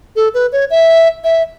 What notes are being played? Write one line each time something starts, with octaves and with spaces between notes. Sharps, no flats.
A4
B4
C#5
E5
E5